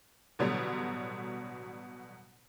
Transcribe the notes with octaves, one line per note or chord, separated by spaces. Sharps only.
A1 B2 D3 F#3 G3